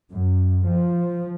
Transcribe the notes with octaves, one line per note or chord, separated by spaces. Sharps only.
F#2
F3